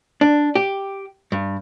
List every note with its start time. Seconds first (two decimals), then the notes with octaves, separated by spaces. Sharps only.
0.21 D4
0.55 G4
1.32 G2